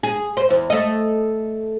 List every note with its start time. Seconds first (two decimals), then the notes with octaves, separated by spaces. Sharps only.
0.03 G#4
0.37 C5
0.50 E2
0.70 A3 D#5